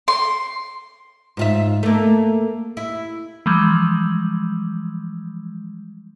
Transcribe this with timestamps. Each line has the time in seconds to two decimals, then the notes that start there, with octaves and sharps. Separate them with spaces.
0.08 C6
1.37 G#2 F4 E5
1.83 A3 A#3
2.77 E4
3.46 E3 F3 G3 G#3